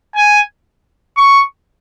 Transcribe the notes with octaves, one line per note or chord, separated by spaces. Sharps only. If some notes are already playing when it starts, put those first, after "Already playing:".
G#5
C#6